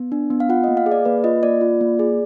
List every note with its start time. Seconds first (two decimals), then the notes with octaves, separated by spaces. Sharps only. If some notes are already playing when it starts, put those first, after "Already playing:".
Already playing: B3
0.12 D4
0.30 B3
0.40 F5
0.49 F4 F#5
0.64 A#3 D#5
0.77 F5
0.86 G#4
0.92 D5
1.05 A#3 B4
1.24 F4 D#5
1.43 A#3 D5
1.61 F4
1.81 A#3
1.99 G#4